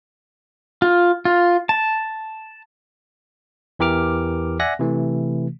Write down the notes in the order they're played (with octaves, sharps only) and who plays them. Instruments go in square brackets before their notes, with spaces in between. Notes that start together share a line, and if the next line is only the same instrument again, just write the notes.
[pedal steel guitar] F4
F4
A5
[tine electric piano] E2 E3 G4 A#4 D6 F6
D5 E5 F#5 G#5 F#6 A#6
C3 E3 A3